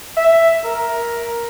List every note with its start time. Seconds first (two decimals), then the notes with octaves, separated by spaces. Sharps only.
0.17 E5
0.64 A#4